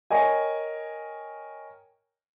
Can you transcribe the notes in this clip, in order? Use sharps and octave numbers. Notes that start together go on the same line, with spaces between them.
A#4 C#5 D#5 G5 G#5